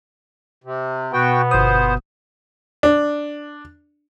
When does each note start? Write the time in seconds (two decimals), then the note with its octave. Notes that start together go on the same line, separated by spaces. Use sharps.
0.64 C3
1.13 B2 B3 F#4 G5
1.51 G1 C5 D#6
2.83 D4